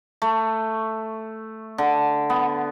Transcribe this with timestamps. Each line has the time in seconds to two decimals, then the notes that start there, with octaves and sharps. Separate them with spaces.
0.22 A3
1.78 D3
2.30 B3